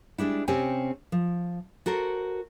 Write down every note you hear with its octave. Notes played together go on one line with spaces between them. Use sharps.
G3 G#3 D4 E4
C3 C4 C#4 G4 G5 G#5
F3
F#4 A4 A#4 C5